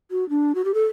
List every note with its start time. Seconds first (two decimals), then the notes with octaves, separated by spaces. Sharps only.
0.11 F#4
0.30 D4
0.55 F#4
0.65 G4
0.74 A4